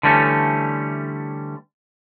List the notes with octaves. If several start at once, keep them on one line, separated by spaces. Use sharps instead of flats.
D3 E3 G3 A3 C#4